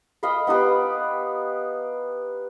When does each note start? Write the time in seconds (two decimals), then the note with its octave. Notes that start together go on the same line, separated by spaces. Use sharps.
0.23 D#5 F5 G5 B5
0.47 B3 D#4 G4 B4